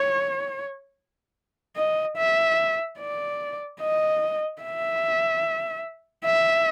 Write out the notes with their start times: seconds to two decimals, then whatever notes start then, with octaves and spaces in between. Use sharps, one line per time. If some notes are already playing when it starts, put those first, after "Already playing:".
Already playing: C#5
1.77 D#5
2.17 E5
2.99 D5
3.81 D#5
4.62 E5
6.25 E5